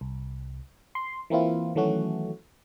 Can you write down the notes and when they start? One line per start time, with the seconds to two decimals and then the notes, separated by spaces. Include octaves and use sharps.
0.01 C2
0.95 C6
1.30 E3 A#3 C4 E4 F4
1.75 D#3 E3 F#3 A3 C#4 F#4